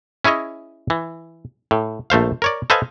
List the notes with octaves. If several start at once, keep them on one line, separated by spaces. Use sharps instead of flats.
C#4 E4 G#4 C#5 D#5
E3
A2
A#1 A3 C5 F5
A#4 C#5 D5
A4 B4 C5 D#5 F5 G#5